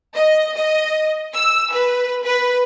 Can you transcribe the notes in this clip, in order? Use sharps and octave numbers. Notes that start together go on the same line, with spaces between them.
D#5
D#5
E6
B4
B4